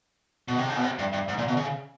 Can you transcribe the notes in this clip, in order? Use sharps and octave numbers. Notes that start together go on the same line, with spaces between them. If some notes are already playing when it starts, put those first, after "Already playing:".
B2
C3
C#3
B2
C3
G2
G2
G#2
A#2
B2
C#3